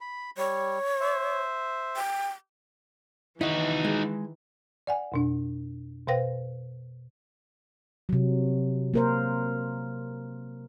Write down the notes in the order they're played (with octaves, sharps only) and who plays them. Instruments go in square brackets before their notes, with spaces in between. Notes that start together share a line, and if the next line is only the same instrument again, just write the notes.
[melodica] B5
[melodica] G3 [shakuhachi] C#5
[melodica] C5 E5
[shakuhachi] G5
[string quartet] D#3 E3 [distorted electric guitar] D#4 F#4 [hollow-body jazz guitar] E4 D#5
[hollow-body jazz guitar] G#3
[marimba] D5 F#5 G#5
F2 B2 D4
B2 B4 C5 F5 G5 A#6
[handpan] C3 F#3
A#3 A#4 C5